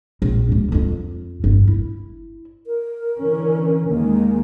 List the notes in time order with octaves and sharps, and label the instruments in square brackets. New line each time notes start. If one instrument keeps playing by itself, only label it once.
[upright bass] A#1
G#1 G#2
F2 F4
G1
E4
[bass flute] A#4
[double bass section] D3 E3 C#4
[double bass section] D#2 D#3 G#3 [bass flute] A#3